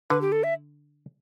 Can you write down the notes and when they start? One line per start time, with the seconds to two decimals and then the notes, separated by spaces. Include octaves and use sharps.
0.10 D3 B4
0.21 G4
0.32 A4
0.44 E5